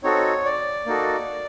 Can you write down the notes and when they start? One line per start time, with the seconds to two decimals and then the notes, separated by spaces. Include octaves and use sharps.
0.04 C4 D#4 F#4 A4 C#5
0.45 D5
0.86 A#3 D#4 F#4 A4